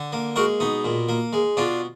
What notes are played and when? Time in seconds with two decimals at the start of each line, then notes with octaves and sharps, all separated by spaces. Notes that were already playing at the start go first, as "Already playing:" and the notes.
Already playing: D3
0.13 A#3
0.36 G#3 F#4 A#4
0.60 B2 D#4
0.85 A#2
1.09 A#3
1.33 G#3
1.57 B2 D4 F4